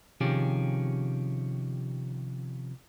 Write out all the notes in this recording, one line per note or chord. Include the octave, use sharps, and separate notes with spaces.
C3 D#3 F3 C#4 G4 G#4